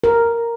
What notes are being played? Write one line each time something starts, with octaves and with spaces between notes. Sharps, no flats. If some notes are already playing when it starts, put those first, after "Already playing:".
A#4